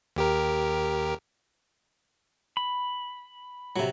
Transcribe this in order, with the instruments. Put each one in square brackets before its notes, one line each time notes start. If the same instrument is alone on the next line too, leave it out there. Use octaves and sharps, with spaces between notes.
[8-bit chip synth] D#2 G4 A#4
[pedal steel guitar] B5
[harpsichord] C3 F#3